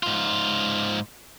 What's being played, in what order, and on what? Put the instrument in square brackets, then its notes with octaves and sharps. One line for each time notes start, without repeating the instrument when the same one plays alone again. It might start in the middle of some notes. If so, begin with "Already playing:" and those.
[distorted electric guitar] G#2 F4